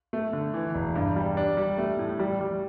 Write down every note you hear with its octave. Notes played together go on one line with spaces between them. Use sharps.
A3
D3
E3
E1
G2
G3
D4
G3
A3
A2
G3
G3